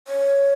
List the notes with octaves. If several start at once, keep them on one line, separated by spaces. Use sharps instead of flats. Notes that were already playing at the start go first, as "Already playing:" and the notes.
C#5